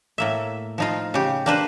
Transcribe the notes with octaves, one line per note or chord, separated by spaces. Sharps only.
A2 A#3 E5
F3 D#4 F4
C#3 G4
A#3 D4 B4 C5